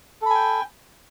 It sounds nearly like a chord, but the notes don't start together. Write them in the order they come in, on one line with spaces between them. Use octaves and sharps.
A4 B5 G#5 G5